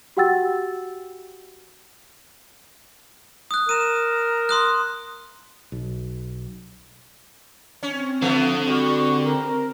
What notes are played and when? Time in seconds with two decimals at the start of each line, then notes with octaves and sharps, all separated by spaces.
0.17 F#4 G4 F#5 G5 E6 A6
3.51 D#6 F#6
3.69 A#4 D#7 E7
4.49 C6 D#6 F#6
5.72 B1
7.83 C4 C#4
8.22 D3 F3 A3 B3
8.67 G3 F#4 C#6
9.24 A#4